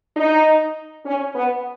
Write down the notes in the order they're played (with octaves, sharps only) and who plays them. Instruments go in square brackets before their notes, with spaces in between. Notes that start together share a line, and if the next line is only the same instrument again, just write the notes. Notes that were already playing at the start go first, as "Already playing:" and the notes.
[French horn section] D#4
C#4
B3